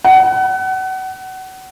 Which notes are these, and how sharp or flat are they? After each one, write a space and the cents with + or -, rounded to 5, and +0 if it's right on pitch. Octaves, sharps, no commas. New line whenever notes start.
F#5 +30